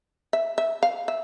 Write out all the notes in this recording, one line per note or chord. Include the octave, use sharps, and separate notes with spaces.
E5
E5
F5
E5